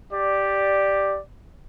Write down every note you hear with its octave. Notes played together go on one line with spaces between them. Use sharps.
G4 D5